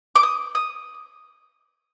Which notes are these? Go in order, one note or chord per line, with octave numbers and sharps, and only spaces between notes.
D6
D#6
D#6